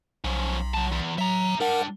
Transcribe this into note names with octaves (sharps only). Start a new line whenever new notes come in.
B1 F3 C#4
F#3 A5
E2
F#3 E5 A#5
G3 D4 A#4 F#5